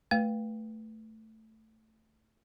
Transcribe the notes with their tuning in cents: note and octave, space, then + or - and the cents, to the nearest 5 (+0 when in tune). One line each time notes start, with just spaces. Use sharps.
A3 +0 B4 -10 F5 +0